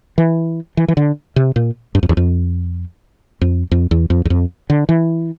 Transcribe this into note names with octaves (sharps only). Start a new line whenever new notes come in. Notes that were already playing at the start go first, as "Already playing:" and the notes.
E3
E3
E3
D3
C3
A#2
G2
F2
E2
F2
F2
F2
E2
F2
E2
F2
D3
E3